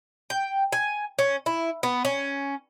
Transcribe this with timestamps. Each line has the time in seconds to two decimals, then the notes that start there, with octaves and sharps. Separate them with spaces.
0.30 G5
0.72 G#5
1.19 C#4
1.46 E4
1.83 B3
2.05 C#4